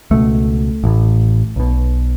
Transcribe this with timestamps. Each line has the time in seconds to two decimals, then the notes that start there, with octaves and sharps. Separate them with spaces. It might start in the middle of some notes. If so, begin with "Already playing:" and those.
0.11 C#2 B2 A3
0.84 A1 A2
1.56 B1 B2